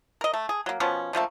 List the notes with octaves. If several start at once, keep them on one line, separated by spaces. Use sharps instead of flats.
A#4 D#5
A3
G#4
F#3 A#3
B2 F3 B3 C#4
D3 F3 A3 A#3